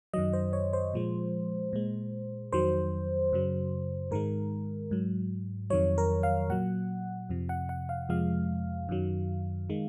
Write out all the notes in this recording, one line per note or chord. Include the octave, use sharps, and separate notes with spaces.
F#2 D#3 F#3 D#5
C5
C#5
C5
A#2 F3 G#3
A#2 G#3
F2 D#3 F#3 C5
F#2 C#3 F#3
G#2 D#3 G#3 A#4
G#2 F#3
F2 D#3 F#3 C#5
A#4
F5
A#2 F#3 F#5
F2 C3 F3
F#5
F#5
F5
F2 C3 F3 G#3 F5
F#2 D#3 F#3
D#3 G#3